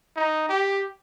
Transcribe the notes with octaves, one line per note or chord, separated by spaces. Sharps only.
D#4
G4